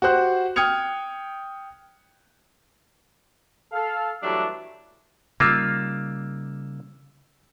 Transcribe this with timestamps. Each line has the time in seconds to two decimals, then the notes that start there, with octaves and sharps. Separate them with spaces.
0.02 F#4 G4 C5 F#6
0.56 G5 D#6 F6 G#6 C#7 F7
3.73 A4 F5
4.23 E3 F#3 G3 A3 D4
5.40 C#3 G3 A#3 D#4 F4 D6 E6